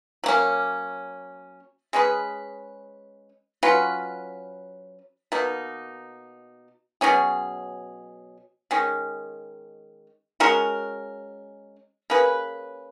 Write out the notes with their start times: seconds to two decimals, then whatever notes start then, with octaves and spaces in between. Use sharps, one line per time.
0.24 F#3 A#3 C#4
1.93 G#3 C#4 G#4 B4
3.63 F#3 C#4 F4 B4
5.32 B2 A#3 D#4
7.01 B2 F#3 C#4 G#4
8.71 D#3 G#3 C#4
10.40 G#3 C#4 F#4 A#4
12.10 A#3 C#4 G#4 B4